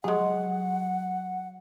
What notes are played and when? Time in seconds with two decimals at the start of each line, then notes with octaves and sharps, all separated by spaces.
0.04 F#3 G#3 G#4 F#5